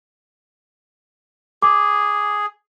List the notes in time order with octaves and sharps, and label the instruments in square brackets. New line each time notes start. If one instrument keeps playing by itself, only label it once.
[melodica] G#4 [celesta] D6